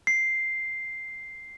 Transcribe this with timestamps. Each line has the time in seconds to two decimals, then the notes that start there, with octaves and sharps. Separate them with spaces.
0.07 C7